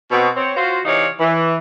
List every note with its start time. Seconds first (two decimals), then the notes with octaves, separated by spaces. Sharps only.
0.11 B2 C4
0.37 C4 C#5
0.57 F4 F#4 C5
0.85 C3 E3 D#4 C#5 D5 F5
1.20 E3